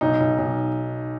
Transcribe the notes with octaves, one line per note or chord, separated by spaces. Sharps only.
B1 D#4
B1
B1